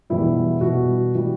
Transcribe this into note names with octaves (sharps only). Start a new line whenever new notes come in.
E2 B2 G3 E4
B2 G3 F#4
E3 G3